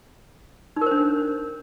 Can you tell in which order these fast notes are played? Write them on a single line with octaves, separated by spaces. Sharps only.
D#4 A#4 C5 D4